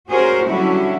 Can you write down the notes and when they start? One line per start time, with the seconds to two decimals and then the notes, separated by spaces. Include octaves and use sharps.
0.10 C#4 F#4 G#4 A#4 C5
0.47 D3 F#3 G3 C#4 E4 F#4